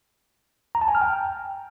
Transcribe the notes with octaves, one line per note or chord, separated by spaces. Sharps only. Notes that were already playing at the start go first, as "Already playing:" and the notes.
A#5
A5
G#5
F6
G5